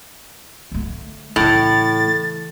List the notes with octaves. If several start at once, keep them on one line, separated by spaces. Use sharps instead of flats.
D3 A3
A2 C#3 E3 A6